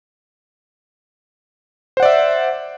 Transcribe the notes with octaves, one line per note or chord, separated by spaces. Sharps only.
C5 D5 E5 F#5